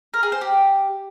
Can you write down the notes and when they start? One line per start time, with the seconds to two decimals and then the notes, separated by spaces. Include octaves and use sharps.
0.14 A#4
0.23 G#4
0.32 C5
0.41 G4